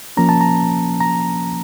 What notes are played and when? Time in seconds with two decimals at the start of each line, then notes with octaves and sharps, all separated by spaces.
0.17 F3 A#3 C#4 A#5
0.29 A5
0.41 A#5
1.00 A#5